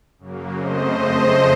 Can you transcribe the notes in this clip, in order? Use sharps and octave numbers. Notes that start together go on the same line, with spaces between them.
F#2 C#3 F#3 A#3
F#2 C#3 A3 C4 C5 D#5
F2 C#3 A3 C4